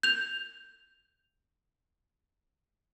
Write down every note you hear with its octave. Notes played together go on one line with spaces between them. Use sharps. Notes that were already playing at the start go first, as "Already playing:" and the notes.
G6 F7